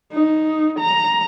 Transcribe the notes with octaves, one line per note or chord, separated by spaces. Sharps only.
D#4
A#5